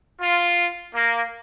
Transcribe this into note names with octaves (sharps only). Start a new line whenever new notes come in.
F4
A#3